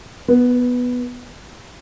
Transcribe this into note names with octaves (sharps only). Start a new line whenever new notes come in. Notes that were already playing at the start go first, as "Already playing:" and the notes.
B3